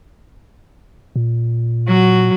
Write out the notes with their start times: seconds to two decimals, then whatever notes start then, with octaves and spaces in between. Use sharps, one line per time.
1.16 A#2
1.86 F#3 F#4